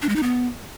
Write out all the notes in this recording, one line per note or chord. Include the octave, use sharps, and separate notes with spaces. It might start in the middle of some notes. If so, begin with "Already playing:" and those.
D4
G#3
D#4
B3